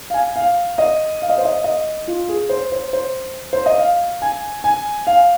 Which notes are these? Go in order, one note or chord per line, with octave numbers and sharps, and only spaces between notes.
F5
G#5
F5
D#5
F5
D#5
C5
D#5
D#5
F4
G#4
C5
C5
C5
C5
D#5
F5
G#5
G#5
F5